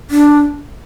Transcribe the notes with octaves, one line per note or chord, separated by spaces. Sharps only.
D4